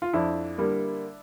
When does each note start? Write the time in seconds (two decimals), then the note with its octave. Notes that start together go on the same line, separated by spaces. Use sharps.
0.02 F4
0.13 F2 D4 E4
0.58 D3 G3 A#3